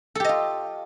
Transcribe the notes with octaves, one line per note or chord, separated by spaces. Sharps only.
F4 G4 A4 D#5